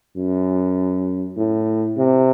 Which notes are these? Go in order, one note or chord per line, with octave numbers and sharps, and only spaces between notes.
F#2
A2
C3